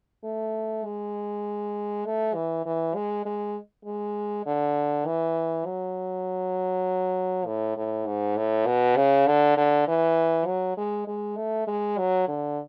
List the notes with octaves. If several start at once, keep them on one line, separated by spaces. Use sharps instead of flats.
A3
G#3
A3
E3
E3
G#3
G#3
G#3
D3
E3
F#3
A2
A2
G#2
A2
B2
C#3
D3
D3
E3
F#3
G#3
G#3
A3
G#3
F#3
D3